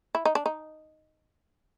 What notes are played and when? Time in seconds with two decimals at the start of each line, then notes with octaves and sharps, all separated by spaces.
0.15 E4
0.25 D#4
0.35 D4
0.46 D#4